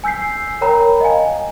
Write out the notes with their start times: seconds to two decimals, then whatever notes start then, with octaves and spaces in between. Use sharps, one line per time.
0.04 G#5 E6 G6 B6 C7
0.61 A#4 C#5 G5 A#5 B5
1.01 D#5 F5 G#5